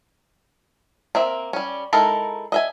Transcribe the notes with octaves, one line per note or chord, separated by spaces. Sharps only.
A#3 C4 E5
G3 C#4
G#3 D#4 E4 A4 A#4
D#5 E5 G#5